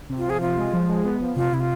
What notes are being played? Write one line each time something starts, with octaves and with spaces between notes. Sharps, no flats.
C3
F4
F3 G#4
C3 F4
G#3
F3
G#3
B3
F3
C3 F4
C3 E4
F4